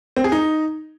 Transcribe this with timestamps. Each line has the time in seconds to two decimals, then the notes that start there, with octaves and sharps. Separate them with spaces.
0.16 C4
0.24 G#4
0.32 D#4